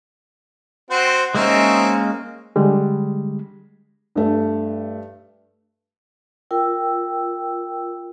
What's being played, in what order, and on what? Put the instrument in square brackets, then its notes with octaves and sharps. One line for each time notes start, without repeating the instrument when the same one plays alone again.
[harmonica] C4 F#4 C5
[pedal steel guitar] G#3 A#3 C#4 [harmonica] C4 D#4 E5
[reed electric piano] D3 G3 G#3
[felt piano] G2 A3
[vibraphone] F4 A#4 G5 E6